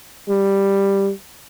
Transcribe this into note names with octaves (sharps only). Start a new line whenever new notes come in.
G3